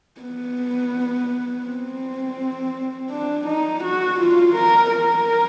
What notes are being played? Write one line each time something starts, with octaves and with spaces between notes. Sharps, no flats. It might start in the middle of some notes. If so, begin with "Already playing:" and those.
B3
C4
D4
D#4
F#4
F4
A#4
A#4